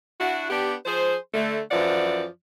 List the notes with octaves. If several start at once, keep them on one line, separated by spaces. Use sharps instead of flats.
D4 E4 F#4
B3 D4 G4
F3 G#4 C5
D3 A3
F#2 E3 F3 D5 F#5